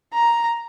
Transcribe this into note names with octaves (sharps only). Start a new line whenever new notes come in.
A#5